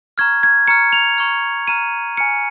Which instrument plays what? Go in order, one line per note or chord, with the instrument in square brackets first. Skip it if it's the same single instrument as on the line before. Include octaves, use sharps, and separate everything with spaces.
[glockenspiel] A#5 C#6 F6 G#6
G#6
A#5 C#6 F6 C#7
F7
A#5 C#6 F6
A#5 F6 D#7
G#5 F6 C#7